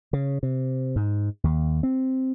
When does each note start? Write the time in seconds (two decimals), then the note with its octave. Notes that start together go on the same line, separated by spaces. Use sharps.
0.13 C#3
0.43 C3
0.96 G#2
1.44 D#2
1.83 C4